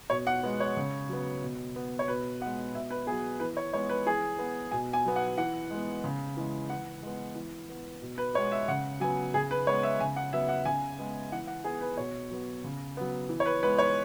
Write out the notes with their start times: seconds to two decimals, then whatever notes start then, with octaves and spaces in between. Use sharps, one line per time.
0.10 B2 C#5
0.27 F#5
0.43 G#3 B3
0.60 C#5
0.77 C#3
1.09 F#3 B3
1.43 B2
1.76 B3
1.99 C#5
2.08 B2 B4
2.41 G#3 B3 F#5
2.74 B2 E5
2.90 B4
3.07 B3 G#4
3.12 F#3
3.40 E3 B4
3.57 C#5
3.73 G#3 B3 C#5
3.89 B4
4.05 E3 G#4
4.39 B3
4.71 B2 G#5
4.93 G#5
5.05 F#3 B3
5.16 F#5
5.37 E3 F#5
5.71 G#3 B3
6.04 C#3
6.37 E3 G#3
6.70 E3 F#5
7.03 G#3 B3
7.35 E3
7.69 B3
8.02 B2
8.18 B4
8.34 G#3 B3 C#5
8.52 E5
8.68 C#3 F#5
9.00 F#3 B3 G#5
9.34 C#3 G#4
9.51 B4
9.67 G#3 B3 C#5
9.83 E5
9.99 C#3 G#5
10.16 F#5
10.33 F#3 B3 E5
10.49 F#5
10.65 C#3 G#5
10.99 G#3 B3
11.32 E3 F#5
11.48 F#5
11.64 B3 G#4
11.81 B4
11.97 B2 C#5
12.31 F#3 B3
12.64 C#3
12.97 F#3 B3
13.29 E3
13.40 C#5
13.46 B4
13.63 G#3 B3 B4
13.79 C#5